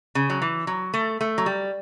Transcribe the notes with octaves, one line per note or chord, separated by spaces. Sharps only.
C#3
F#3
E3
F#3
A3
A3
F#3
G3